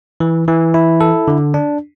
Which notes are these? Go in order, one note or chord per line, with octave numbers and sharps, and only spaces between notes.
E3
E3
E4
A4
D3
D4